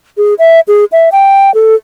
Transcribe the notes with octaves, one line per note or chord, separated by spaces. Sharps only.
G#4
E5
G#4
E5
G5
A4